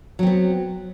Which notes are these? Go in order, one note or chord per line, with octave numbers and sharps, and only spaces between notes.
F#3 B3 C4